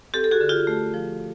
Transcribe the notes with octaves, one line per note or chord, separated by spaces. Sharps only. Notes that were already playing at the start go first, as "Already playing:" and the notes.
C4 G4 A4
A4
F#4 G#4
D3
F4 G4
A3
F3